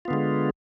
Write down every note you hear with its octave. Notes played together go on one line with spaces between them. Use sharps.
D3 G#3 B3 F4